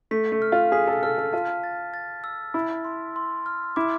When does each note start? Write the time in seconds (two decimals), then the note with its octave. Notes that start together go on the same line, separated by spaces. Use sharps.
0.11 A3 B6
0.32 A3
0.42 F6
0.52 F4
0.72 G#4 B6
0.87 A4
1.03 A4 F6
1.18 A4
1.33 F4 A5
1.64 A6
1.94 A6
2.24 E6
2.54 E4 A6
2.85 C6
3.16 C6
3.46 F6
3.76 E4 D6